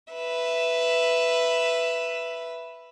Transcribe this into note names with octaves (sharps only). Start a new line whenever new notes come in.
B4 E5